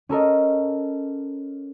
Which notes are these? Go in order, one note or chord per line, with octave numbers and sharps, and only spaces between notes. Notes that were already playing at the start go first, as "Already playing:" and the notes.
C#4 A4 A#4 D#5